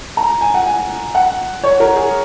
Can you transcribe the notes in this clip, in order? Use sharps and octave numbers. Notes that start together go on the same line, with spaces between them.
A#5
G#5
F#5
G#5
F#5
C#5
A#4
G#4